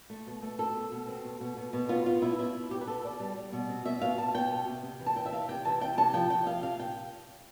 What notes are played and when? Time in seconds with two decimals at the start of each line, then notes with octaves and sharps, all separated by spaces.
0.10 A3
0.26 B2
0.42 A3
0.59 C4 A4
0.75 B2
0.91 B2
1.08 C4
1.24 B2
1.40 B2
1.57 B2
1.73 B2
1.89 B3 F4
2.05 B3 F4
2.22 B2 E4
2.38 B2 E4
2.54 B2
2.71 B2 G4
2.81 B4
2.87 B3 A4
3.03 B2 D5
3.20 G3
3.36 G3
3.52 B2
3.69 C4
3.85 B2 E5
4.02 B2 F5
4.18 B2 A5
4.34 B2 G5
4.51 B3
4.67 C3
4.83 C3
4.99 E3
5.06 A5
5.16 E3 G5
5.26 E5
5.32 C3 F5
5.49 C3 G5
5.65 E3 A5
5.81 C3 G5
5.97 C3 A5
6.13 F3 G5
6.30 F3 G5
6.46 C3 F5
6.63 C3 F5
6.79 C3 G5